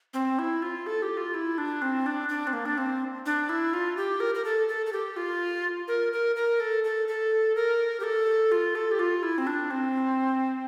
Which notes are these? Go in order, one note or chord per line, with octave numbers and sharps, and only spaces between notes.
C4
E4
F4
A4
G4
F4
E4
D4
C4
D4
D4
C4
A#3
D4
C4
D4
E4
F4
G4
A#4
A#4
A4
A4
A4
G4
F4
A#4
A#4
A#4
A4
A4
A4
A#4
G4
A4
F4
A4
G4
F4
E4
C4
D4
C4